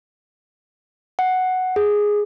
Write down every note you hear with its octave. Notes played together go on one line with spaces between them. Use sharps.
F#5
G#4